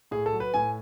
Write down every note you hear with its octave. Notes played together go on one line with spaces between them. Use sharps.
A2 G#4
A4
F#3
B4
A2 G#5